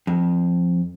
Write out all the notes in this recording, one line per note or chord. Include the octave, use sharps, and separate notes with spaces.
F2